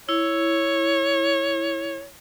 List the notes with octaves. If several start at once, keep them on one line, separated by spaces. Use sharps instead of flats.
E4 C#5